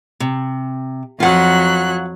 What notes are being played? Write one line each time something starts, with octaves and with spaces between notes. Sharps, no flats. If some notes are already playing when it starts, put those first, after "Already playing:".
C3
F2 F#3 F4 F#5 F#6